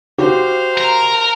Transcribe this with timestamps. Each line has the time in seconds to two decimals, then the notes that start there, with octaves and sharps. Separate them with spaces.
0.18 F#4 G4 C5 F5
0.77 A#4 A#5